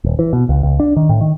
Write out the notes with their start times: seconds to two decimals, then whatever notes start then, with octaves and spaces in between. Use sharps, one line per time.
0.04 D#1
0.19 E3
0.33 B2
0.49 C#2
0.63 C#2
0.80 D4
0.96 D#3
1.09 A2
1.21 D#3